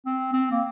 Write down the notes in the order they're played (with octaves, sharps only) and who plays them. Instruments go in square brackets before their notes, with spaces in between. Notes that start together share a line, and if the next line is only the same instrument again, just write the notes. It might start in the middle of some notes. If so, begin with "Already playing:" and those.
[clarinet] C4
C4
A#3